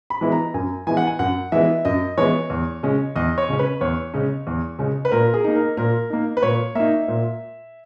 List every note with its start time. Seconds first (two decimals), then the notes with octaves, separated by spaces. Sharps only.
0.10 B5
0.21 E3 G#3 B3 E4
0.32 A#5
0.54 F#2 G#5
0.87 E3 G#3 B3 E4 G#5
0.97 F#5
1.07 G#5
1.19 F#2 F#5
1.52 E3 G#3 B3 E4 E5
1.85 F#2 D#5
2.17 E3 G#3 B3 E4 C#5
2.50 E2
2.83 C#3 G#3 C#4
3.16 E2 D#5
3.38 C#5
3.49 C#3 G#3 C#4
3.59 B4
3.81 E2 C#5
4.14 C#3 G#3 C#4
4.47 E2
4.79 C#3 G#3 C#4
5.05 B4
5.12 A#2 A#4
5.34 G#4
5.44 A#3 D#4
5.56 A#4
5.77 A#2 A#4
6.10 A#3 D#4
6.37 B4
6.42 A#2 C#5
6.75 A#3 D#4 E5
7.08 A#2